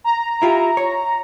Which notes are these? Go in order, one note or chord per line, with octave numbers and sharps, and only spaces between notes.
A#5
E4 F4 G4
C#5